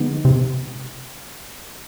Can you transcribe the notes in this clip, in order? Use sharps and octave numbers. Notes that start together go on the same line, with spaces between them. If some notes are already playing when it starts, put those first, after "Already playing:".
Already playing: D3 F3 G#3 B3 D#4
C3